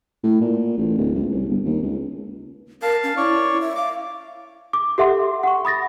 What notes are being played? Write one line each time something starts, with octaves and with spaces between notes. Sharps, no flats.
A2
A#2
A1
D1
C#2
C2
G1
D#2
C#2
A#4 F5 A5
C#4
E4 C#5 D5 C#6
E5
F5 D6
D6
G4 A4 E5 F#5 C6
F#5 C#6
B5 D#6 A6 A#6